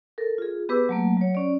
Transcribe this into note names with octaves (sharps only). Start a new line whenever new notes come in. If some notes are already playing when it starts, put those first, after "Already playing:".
A4 A#4
F4 G#4
B3 G4 G#4 B4 D6 E6
F#3 A3 A#3
F#3 C#5
C#4 D5